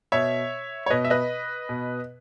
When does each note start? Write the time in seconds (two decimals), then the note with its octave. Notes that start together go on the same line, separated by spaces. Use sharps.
0.12 B2 C#5 E5
0.86 C#5
0.90 B2 B4 D#5
1.04 E5
1.10 B4 D#5
1.69 B2